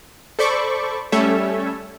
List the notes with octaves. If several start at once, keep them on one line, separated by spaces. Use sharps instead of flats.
A4 C5 D5 B5 C#6 D6
G3 A3 C#4 A4 C#5 E5